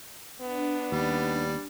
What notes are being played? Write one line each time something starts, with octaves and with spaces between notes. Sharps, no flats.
B3 D4
D#2 G3